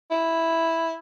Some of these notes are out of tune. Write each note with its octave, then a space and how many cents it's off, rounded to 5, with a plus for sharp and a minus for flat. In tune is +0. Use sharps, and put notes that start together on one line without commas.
E4 -5